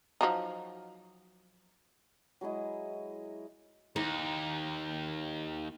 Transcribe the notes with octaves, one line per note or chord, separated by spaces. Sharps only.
F3 F#3 D#4
F#3 G#3 E4 D#5
D#2 D#4